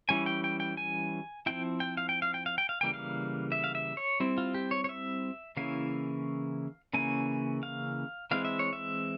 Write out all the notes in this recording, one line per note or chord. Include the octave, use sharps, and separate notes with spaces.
E3 G3 C#4 E4 G#5
G5
G5
G5
G#5
F3 C4 E4 G5
G5
F5
G5
F5
G5
F5
G5
F5
C#3 E3 G3 A#3 G5
F5
E5
F5
E5
C#5
G3 C4 E4
F4
G4
C#5
C#5
E5
C#3 E3 A#3 C#4 E4 F5
C#3 E3 A#3 C#4 E4 G#5
F5
E3 G#3 C4 E4 F5
E5
C#5
E5